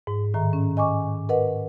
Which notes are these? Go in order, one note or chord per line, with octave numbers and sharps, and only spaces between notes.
G#2
A2 D#3 E5 A#5
C#4
D#5 G#5 C#6 D6
A#4 B4 D#5 F#5